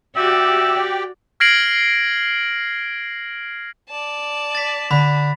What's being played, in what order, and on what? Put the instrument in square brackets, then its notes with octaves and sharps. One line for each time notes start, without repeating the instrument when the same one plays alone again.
[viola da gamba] F#4 D5 [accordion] G4 G5 [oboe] E5
[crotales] F6 G#6 A#6 C7 D7 F#7
[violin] D5 A5
[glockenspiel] A6 B6
[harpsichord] D3 [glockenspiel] B5 B6